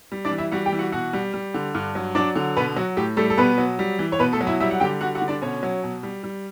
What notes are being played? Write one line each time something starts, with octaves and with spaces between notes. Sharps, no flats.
G3
D4 D5
E3
E4 E5
G3 F#4 F#5
G4 G5
E3
F#4 F#5
B2 F#4 F#5
G3
G3
D3
G2
F#3
F#3 D4 D5
D3
B2 B3 B4
F#3 F#4
A2 G4
G3 A3 A4
A4
B2 B3 B4
F#3
G3
E3
C#5
B2 B3 B4
A3 A4
F#3
E4 E5
G3 E4 E5
F#5
D3 G4 G5
G3 F#4 F#5
F#4 F#5
D3
D4 D5
B2 C#4 C#5
F#3
B2
G3
G3